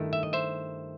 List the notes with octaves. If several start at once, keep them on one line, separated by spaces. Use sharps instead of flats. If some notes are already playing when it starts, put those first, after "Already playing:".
Already playing: G2 D#3 A3 E4
E5
D#5
C5 E5